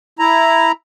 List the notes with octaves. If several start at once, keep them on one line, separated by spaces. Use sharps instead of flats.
E4 A#5